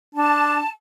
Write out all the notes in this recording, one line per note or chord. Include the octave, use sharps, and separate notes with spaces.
D4 A5